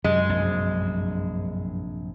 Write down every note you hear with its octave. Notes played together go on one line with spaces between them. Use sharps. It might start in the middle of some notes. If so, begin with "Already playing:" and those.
F#2 C3 G#3
A#1 G2 C3